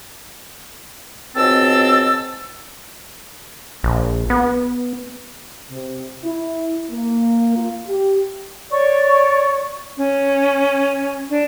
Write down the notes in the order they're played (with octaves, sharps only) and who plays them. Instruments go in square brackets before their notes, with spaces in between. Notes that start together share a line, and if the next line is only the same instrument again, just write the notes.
[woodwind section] C#2 G#2 B2 C4 A5 E6
[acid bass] A#1
B3
[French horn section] C3
E4
A#3
F4
G4
[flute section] C#5 D5 C#6
C#4
D4